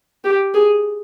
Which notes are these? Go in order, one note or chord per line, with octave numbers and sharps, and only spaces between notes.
G4
G#4